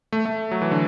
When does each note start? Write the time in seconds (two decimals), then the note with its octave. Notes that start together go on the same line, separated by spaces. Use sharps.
0.12 A3
0.25 A3
0.51 F#3
0.62 E3
0.71 D3